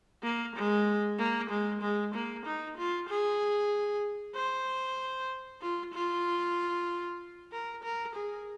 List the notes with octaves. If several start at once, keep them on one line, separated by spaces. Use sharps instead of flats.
A#3
G#3
A#3
G#3
G#3
A#3
D#4
F4
G#4
C5
F4
F4
A#4
A#4
G#4